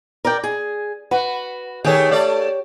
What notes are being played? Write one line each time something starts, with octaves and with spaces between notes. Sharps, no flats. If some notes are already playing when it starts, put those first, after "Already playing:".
A#4 D5 G5
G#4
F#4 B4
D#3 A3 G4 G#4 C#5
A3 D5